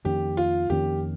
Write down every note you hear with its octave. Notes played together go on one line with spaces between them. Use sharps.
F2 D#3 A#3 C#4 G4
F4
F2 D#3 A#3 C#4 G4